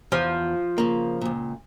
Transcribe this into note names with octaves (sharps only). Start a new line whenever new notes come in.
E2 F3
C#3 A#3
C#2 A#2